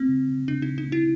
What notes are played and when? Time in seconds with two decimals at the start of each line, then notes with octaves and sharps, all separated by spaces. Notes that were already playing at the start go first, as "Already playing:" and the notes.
Already playing: A3 C4
0.09 C#3
0.29 C#3
0.48 C#3 D4
0.62 C#3 D#4
0.78 D#4
0.87 A3
0.92 E4